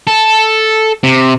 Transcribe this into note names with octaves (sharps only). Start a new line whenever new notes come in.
A4
C3